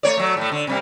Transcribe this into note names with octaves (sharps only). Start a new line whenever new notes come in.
A3 C#5 D5
F#3 A3
A2 A3
D3
C3 G3 A#3